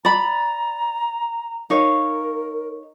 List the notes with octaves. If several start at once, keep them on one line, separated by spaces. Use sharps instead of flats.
D5 A#5 B5
D#4 A#4 C#5 F5